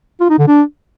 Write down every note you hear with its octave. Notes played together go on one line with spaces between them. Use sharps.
F4
D#4
D3
D4